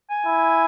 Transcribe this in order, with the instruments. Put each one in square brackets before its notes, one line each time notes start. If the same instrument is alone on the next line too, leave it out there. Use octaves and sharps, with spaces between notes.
[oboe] G#5
[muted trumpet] E4